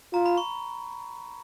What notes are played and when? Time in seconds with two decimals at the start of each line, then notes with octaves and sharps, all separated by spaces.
0.13 F4 A#5
0.26 B5
0.38 C#6